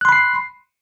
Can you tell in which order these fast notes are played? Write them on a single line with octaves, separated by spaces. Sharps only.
F#6 C6 B5 C7